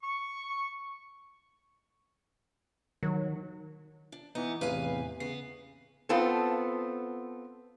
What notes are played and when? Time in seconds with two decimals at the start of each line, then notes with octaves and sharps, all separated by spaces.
0.03 C#6
3.03 D#3 F#3
4.12 D4
4.35 E3 B3 D#4
4.61 E2 A2 C3 B4 F5 G#5
5.20 C#3 B3 C7
6.09 B3 C4 F4 A4